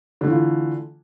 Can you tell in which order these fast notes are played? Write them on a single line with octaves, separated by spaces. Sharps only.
D3 A3 E3 F4